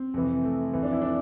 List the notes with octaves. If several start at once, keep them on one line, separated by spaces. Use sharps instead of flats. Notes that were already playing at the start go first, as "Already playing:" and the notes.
Already playing: C4
F2 C3 E3
A3
F2 E3
D4
E4
D4